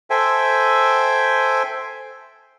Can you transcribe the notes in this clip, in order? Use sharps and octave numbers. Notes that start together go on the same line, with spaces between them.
A4 C5 E5 G5 G#5